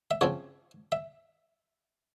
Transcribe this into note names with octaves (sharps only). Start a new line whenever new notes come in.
E5
C#3 F3 C4 C#5
E5